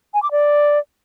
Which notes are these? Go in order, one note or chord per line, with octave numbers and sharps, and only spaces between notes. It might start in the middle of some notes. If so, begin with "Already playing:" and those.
G#5
D6
D5